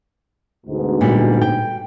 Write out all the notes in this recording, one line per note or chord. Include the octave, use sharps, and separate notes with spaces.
D2 G#2 B2
A#2 G3
G5